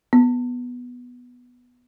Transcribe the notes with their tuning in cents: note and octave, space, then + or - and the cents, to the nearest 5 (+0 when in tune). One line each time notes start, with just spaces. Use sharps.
B3 -5